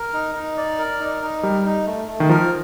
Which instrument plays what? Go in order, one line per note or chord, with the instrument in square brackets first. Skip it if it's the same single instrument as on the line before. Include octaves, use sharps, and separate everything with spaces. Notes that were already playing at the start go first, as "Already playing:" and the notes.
Already playing: [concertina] A#4
D#4
D#4
D5
A#4
D#4
D#4
[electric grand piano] G3 [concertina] A#4
[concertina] D#4
A3
A3
[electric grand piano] D#3
[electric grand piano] F3 [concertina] A#4